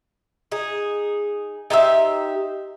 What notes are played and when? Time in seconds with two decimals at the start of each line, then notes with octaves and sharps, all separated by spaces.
0.52 D#4 G#4
1.70 D#4 G4 C5 E5